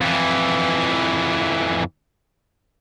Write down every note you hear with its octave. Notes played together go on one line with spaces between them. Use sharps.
F2 E3